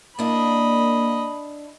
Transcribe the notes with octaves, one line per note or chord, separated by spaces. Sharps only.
A#3 D4 E4 D#5 B5